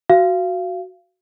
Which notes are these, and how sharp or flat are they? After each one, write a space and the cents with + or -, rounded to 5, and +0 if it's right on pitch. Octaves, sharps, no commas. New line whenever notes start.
F#4 +0 F5 -25